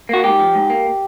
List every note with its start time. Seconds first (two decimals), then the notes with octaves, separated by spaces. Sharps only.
0.09 A#3 F#4
0.24 G#2 G4
0.39 F3
0.55 G#2
0.70 A#3